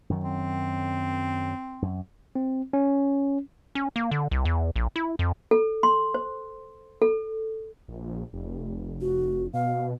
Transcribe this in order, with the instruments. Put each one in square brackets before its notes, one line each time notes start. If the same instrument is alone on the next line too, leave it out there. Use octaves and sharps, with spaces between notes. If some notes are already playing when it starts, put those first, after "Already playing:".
[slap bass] F#2 D#3 F#3
[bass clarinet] C4
[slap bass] F#2
[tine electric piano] C4
C#4
[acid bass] C#4
A#3
D3
C2
E2
A#1
E4
F2
[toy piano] A4
C6
C5
A4
[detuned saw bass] A#1
F1
[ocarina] F#4
[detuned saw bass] B2 [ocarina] F5